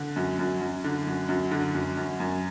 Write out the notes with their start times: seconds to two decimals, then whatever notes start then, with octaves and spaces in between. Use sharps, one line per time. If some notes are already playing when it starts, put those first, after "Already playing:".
Already playing: D3
0.16 F#2
0.39 F#2
0.61 F#2
0.84 D3
1.07 F#2
1.29 F#2
1.51 D3
1.74 F#2
1.97 F#2
2.20 F#2